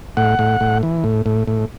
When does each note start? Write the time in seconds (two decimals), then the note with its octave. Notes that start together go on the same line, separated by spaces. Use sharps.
0.17 A2 F#5
0.39 A2
0.60 A2
0.83 E3
1.04 A2
1.26 A2
1.47 A2